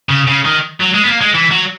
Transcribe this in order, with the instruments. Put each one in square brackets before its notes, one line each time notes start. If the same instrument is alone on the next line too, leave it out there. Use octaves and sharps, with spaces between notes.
[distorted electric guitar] C#3
C#3
D#3
F#3
G#3
B3
A#3
G#3
E3
F#3